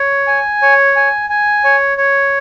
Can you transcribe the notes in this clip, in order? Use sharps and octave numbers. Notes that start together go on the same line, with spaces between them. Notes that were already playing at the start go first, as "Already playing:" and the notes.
Already playing: C#5
G#5
C#5
G#5
G#5
C#5
C#5